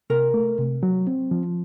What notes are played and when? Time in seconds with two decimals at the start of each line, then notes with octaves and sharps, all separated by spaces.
0.10 C3 A#4
0.34 A3
0.59 C3
0.83 F#3
1.07 C4
1.31 F3